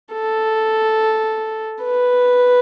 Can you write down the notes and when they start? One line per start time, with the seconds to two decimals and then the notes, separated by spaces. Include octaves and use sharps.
0.13 A4
1.83 B4